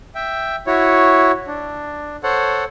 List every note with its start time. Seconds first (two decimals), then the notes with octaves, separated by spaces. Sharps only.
0.15 E5 G5
0.67 E4 F#4 C#5
1.47 D4
2.23 A4 C5 C#5 F#5